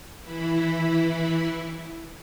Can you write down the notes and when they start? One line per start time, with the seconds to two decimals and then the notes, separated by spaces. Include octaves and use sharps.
0.22 E3 E4